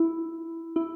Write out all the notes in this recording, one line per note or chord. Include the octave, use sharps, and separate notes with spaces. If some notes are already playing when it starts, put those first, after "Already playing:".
Already playing: E4
E4